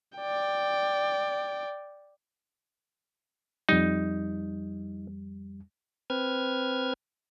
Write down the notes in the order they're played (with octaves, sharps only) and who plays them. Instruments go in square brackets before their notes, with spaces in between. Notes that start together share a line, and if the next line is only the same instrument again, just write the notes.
[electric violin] D5 G5
[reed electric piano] F2 G3 [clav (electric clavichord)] D#4
[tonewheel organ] C4 B4 F6 G#6